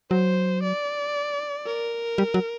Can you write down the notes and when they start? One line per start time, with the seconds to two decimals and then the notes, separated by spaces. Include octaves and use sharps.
0.11 F#3 C5
0.63 D5
1.66 A#4
2.18 G3
2.34 F#3